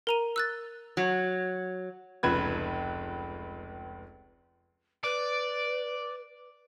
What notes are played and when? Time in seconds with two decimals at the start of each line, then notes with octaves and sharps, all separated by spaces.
0.07 A#4 A#5 D#7
0.36 E6 F#6 A6
0.97 F#3
2.23 F1 C#2 B4 G#6
5.04 B4 D5